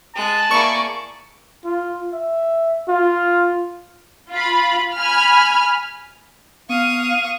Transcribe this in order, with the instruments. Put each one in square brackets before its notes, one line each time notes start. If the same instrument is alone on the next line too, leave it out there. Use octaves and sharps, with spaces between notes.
[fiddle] G#3 F#6 [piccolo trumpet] A5
[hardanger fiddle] A#3 D5 [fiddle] E4 G#4 [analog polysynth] C#6
[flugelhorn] F4
E5
F4
[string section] F4 B5
G#5 B5 F6
[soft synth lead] B3 [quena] F5 [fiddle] C#6 D#6